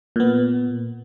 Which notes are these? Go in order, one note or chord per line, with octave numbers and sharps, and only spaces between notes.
A#2 B3